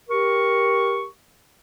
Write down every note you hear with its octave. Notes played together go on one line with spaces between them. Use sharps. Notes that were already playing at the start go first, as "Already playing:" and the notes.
G4 A#4 C#6